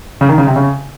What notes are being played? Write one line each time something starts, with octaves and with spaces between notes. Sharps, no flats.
C#3
D#3
C#3
C3
C#3